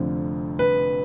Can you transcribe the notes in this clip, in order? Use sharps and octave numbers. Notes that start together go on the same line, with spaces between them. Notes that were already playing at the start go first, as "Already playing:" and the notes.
Already playing: F1 F2 D3 F3
B4